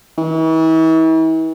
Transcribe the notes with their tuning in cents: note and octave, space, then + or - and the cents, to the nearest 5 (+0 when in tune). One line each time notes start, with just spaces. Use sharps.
E3 -40